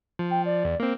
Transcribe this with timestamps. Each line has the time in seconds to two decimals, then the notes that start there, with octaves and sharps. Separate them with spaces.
0.19 F3
0.31 G5
0.45 D5
0.65 E2
0.80 A#3 C4